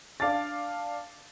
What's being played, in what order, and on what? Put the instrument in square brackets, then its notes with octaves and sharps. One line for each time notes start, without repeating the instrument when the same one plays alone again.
[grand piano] D4 F5 A5 D6 A6